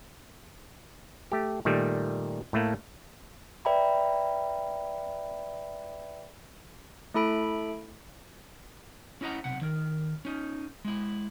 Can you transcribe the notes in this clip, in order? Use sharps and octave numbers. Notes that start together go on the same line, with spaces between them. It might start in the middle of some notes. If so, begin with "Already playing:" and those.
A3 G4
A#2 D#3 G3 A3
A2 A3 A#3
B4 D5 E5 G5 A#5 B5
A3 E4 A4 B5 D7
C#4 E4 D#5 F#5 A#5
B1 C3 F#5
D#3 A#4
C#4 D#4
G#3 E4